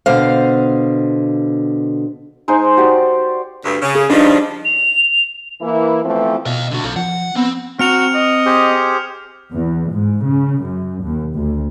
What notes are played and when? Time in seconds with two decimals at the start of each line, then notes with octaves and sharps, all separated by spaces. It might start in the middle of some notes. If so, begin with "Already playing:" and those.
0.06 B2 D3 C5 F5
2.48 G#3 D#4 C5 G#5
2.77 F#4 G4 D5
3.65 D2 G2
3.82 C#3
3.95 G#4
4.10 G2 F3 D4 D#4
4.65 F7
5.62 E3 A#3 E4
6.05 E3 F3 A3 B3 C4 E4
6.46 B2 D#5 F5
6.71 D3 F#4
6.85 B1 A4 F5
6.96 F3 F#5
7.36 B3 C4
7.79 C4 F#4 A#5 F6 C#7 F7
8.15 D#5
8.46 G4 G#4 C5
9.52 E2
9.90 G#2
10.22 C#3
10.62 F#2
11.02 D#2
11.32 D2